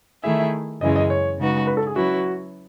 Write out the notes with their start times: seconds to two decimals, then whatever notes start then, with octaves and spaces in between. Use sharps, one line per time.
0.23 D#3 A3 E4 G#4 E5
0.81 F#2 C#3 E3 G#3 C#4 D#5
0.96 D#5
1.10 C#5
1.39 C#3 G#3 D#4 F#4 B4
1.67 B4
1.77 A4
1.87 G#4
1.96 F#3 C#4 E4 F#4 B4